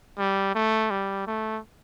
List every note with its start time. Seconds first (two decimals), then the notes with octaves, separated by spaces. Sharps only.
0.19 G3
0.55 A3
0.91 G3
1.27 A3